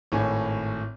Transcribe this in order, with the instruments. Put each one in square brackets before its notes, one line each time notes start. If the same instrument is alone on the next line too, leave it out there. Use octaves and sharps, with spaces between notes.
[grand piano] G#1 A2 C#5 G#5